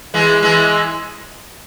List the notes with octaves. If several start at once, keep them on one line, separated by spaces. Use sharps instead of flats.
E3 G#3
E3 G#3